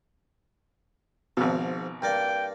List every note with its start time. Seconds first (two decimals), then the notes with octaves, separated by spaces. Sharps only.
1.37 G#1 G#2 B2 F3
2.02 G2 A#3 D5 G5